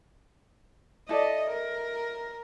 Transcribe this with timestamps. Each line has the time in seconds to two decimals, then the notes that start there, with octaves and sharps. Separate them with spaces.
1.09 E4 A4 D5 D#5
1.51 A#4